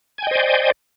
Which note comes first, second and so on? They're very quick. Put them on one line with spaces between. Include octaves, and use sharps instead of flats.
G#5 G5 D#5 C5 D5